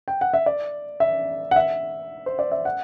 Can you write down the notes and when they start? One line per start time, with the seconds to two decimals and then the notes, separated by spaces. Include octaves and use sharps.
0.08 G5
0.21 F#5
0.34 E5
0.46 D5
1.00 E5
1.51 F#5
1.56 E5
2.26 C5
2.39 D5
2.52 E5
2.65 F#5